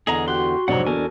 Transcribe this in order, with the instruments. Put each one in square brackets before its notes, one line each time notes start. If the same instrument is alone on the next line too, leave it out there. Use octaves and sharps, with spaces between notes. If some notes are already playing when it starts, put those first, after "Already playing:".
[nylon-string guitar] E2 D3 B3 [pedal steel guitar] G#4 D#5 A#5
[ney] F#4 [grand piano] G4 F#6 [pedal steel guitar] C6
[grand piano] F2 G#2 C3 [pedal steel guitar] F#3 F#5 [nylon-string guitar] D4 D5 D#5
[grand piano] E2 [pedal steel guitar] A4 A#4 G#5